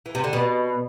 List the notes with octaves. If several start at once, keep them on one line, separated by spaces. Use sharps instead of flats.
E3
C3
D3
B2